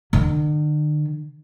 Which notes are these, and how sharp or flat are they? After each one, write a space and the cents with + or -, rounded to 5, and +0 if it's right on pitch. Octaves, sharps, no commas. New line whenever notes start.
D3 +45